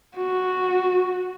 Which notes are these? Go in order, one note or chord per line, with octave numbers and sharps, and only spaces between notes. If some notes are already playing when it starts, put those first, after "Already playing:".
F#4